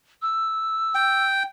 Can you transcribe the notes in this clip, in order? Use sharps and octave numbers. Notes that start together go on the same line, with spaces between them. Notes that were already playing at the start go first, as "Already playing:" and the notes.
E6
G5